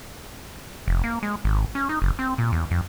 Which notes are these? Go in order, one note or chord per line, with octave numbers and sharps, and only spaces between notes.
F1
A#3
G#3
G#1
C#4
D#4
F#1
C4
A#2
E2
F2